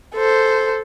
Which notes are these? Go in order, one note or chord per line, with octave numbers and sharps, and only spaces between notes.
A4 C5